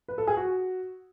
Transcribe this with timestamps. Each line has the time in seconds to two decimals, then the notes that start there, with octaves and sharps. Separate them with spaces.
0.08 B4
0.18 A4
0.27 G#4
0.37 F#4